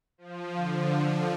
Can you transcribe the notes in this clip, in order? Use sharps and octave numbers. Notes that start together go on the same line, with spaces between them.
F3
D3